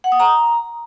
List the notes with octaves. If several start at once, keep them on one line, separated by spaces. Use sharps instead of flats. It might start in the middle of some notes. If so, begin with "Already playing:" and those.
F#5
D#6
A#5